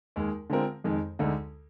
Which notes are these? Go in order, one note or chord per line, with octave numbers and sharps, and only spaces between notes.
D#2 D#3 G#3
D3 G#3 C4 F4 A#4
F2 D#3 G#3
D2 D3 G#3 D#4